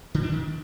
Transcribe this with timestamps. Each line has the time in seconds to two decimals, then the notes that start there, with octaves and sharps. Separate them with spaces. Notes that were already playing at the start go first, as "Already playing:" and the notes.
0.14 D3
0.23 D4
0.32 D#3